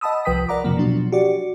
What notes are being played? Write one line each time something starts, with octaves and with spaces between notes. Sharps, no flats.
D#5 F#5 A5 B5 D#6 E6
C2 F3 B4 G5 D#6 B6
A#4 D5 F#5 A#5 D6
F2 C3 F3 A#3
B2 F3 F#3 D4 F#4
F#4 G4 D5